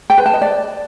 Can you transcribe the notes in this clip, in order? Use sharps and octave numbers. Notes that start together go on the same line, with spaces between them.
G5
B4
A5
D#5
D5